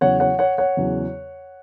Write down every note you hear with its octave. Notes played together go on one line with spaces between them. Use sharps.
E2 C#3 F#3 C#5 F#5
C#5 F#5
C#5 F#5
C#5 F#5
E2 C#3 F#3